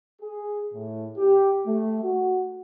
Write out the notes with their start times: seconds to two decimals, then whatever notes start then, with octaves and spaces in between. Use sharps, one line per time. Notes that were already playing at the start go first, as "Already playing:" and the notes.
0.22 G#4
0.74 A2
1.16 G4
1.66 A3
2.03 F#4